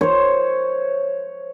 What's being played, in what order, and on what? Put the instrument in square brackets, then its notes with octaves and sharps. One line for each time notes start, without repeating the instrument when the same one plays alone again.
[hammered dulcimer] C5 C#5